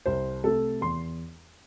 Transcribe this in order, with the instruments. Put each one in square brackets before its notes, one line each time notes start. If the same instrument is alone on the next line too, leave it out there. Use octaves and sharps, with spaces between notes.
[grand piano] C2 C5
C3 A3 A4
E2 C6